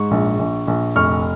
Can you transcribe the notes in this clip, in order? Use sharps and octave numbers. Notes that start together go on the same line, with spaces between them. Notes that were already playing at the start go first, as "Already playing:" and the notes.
Already playing: G#2 C#6
A#1
A#1
A#1
F1 C#6 F6